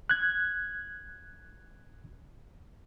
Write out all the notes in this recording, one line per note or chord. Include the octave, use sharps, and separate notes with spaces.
F#6 G#6